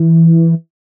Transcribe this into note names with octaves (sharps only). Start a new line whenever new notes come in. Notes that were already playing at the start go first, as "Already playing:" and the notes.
Already playing: E3